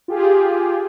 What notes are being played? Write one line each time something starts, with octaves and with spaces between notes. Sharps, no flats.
F4 G4 G#4